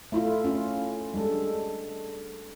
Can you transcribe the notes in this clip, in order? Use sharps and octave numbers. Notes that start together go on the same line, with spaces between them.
A3 E4 F4
C#4 F4
G3 G#3 D4 A4